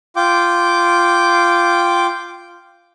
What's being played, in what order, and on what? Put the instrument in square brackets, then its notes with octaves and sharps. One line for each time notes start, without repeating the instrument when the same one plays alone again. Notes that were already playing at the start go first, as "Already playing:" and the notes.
[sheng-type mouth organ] F4 G5 D6